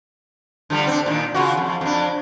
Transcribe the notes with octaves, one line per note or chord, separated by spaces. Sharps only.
D3 F3 G3
C4 D4
A#2 D#3
C#3 F4 F#4
F2
F2 D4